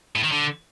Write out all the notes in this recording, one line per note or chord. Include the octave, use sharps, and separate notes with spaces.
A2
D#3
D3